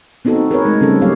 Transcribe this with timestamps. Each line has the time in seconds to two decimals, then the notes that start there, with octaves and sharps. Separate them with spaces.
0.25 B3 C4 D#4 F#4 A4
0.51 G#4 A#4 B4 C#5
0.65 G#3 A3 D#4
0.81 C#3 G3 C4 C#4 A4
1.01 F#3 A#3 G4 C#5 F5